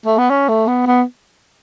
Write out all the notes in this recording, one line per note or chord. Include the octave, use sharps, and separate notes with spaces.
A3
B3
C#4
A3
B3
B3